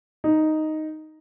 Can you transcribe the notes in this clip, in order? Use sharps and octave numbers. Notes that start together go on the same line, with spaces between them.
D#4